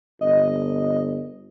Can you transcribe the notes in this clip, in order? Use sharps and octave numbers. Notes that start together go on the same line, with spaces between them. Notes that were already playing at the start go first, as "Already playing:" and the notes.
G1 D#5